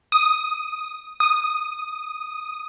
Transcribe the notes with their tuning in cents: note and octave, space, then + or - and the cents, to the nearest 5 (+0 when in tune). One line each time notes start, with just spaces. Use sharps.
D#6 +5
D#6 +0